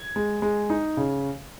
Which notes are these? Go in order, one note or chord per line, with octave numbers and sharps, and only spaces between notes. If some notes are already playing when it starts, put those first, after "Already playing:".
Already playing: G#6
G#3
G#3
D#4
C#3